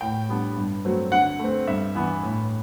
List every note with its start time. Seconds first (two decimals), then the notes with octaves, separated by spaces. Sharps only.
0.01 A2 G5
0.29 G3 B3 D4
0.57 G2
0.85 F#3 A3 C4
1.12 D3 F#5
1.39 A3 C4
1.68 G2 E5
1.95 E3 B3 D4
2.23 A2